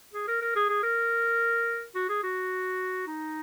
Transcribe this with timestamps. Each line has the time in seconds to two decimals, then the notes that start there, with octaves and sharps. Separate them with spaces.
0.14 G#4
0.28 A#4
0.42 A#4
0.56 G#4
0.69 G#4
0.83 A#4
1.95 F#4
2.09 G#4
2.23 F#4
3.07 D#4